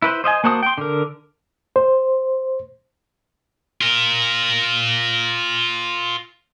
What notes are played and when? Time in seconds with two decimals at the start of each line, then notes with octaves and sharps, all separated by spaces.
0.02 E4 B4 C5
0.24 C5 D#5 E5 G#5
0.44 A#3 F#4 C5 A5 D#6
0.63 G5 C6
0.78 D3 A#4
1.76 C5
3.81 F4 A#4